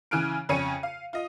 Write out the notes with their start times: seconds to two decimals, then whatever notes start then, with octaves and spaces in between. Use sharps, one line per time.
0.11 C#3 E3 G#5 F6 F#6 D7
0.49 F2 C#3 C#5 G#5 C#7 D#7
0.83 F5
1.13 F4 D#5